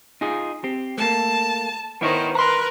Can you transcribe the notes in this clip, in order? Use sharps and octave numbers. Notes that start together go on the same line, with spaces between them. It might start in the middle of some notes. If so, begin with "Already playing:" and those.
D#4 F4 G#4
C4 G4
A3 A#3 A5
D#3 B3 E4 C5 C#5
A#4 B4 A#5 C6